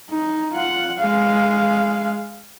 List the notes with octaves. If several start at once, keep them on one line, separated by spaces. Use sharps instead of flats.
D#4
F4 F#5
G#3 F5